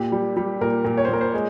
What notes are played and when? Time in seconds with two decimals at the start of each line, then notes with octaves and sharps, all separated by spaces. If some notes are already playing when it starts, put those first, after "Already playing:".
Already playing: A#2 G4
0.12 G3
0.36 G3
0.61 A#2 A#4
0.85 A#2
0.97 C#5
1.05 C5
1.09 A#2 A#4
1.21 C5
1.34 G#3